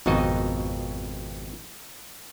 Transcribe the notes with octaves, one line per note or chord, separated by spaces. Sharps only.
G#1 F2 B2 D#4 F#4 D#5